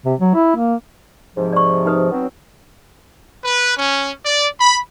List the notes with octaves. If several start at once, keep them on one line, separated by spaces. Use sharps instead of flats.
C3
F#3
E4
A#3
G#2 C3 F3
D5 C#6
D#4 B4 D#6
F#3 B3 C4
B4
C#4
D5
B5